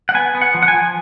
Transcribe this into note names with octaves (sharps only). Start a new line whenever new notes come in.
F#5
B3 G#5
B3
F#5
F3
F#5
G#5
F3